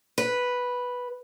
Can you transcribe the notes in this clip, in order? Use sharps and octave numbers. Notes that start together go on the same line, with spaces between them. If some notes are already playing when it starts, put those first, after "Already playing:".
B4